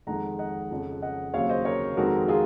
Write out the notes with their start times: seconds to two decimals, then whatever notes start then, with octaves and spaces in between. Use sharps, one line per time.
0.07 F2 D#3 G#3 F#5 A#5
0.39 D#5 F#5
0.71 F2 C#3 F3
1.02 D#5 F#5
1.34 D#2 C#3 F#3 C4 C#5 F5
1.49 C5 D#5
1.65 A#4 C#5
1.97 F2 D#3 G#3 C4 F#4 A#4
2.28 F4 G#4